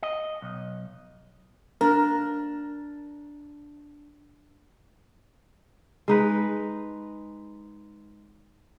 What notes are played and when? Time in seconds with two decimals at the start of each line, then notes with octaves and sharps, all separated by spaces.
0.03 D#5
0.42 B1
1.81 D4 A#4
6.08 G#3 D#4 B4